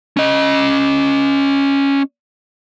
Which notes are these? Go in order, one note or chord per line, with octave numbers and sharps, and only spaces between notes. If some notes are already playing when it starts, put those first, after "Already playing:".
C#4 D#5